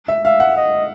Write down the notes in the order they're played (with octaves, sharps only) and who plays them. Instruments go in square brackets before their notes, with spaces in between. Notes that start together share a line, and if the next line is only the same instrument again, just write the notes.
[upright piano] E5
[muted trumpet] E5 [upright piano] F5
[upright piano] F#5
[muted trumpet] D#5